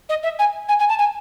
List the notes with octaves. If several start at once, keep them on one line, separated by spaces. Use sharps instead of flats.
D#5
E5
G#5
G#5
G#5
A5
G#5